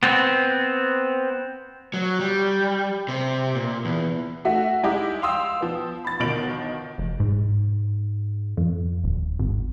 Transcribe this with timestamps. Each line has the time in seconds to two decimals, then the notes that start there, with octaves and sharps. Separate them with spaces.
0.03 B3 C4
1.94 F#3
2.20 G3
3.08 C3
3.55 A#2
3.85 E2
4.45 A3 F#4 E5
4.83 G#3 D#4 E4 G4
5.22 F5 G5 C6 D#6 E6
5.61 F3 B3
6.05 B5 A6
6.20 G1 B2 D#3 F3 D7 F#7
6.98 F1
7.20 G#2
8.57 F2
9.04 D#1
9.39 G#1